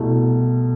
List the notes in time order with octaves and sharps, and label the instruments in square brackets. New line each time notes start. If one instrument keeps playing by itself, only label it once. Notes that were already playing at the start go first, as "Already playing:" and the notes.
Already playing: [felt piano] C2 B2 A3